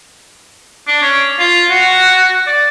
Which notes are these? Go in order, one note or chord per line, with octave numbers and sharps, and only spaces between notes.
D4
C#4
F4
F#4
D5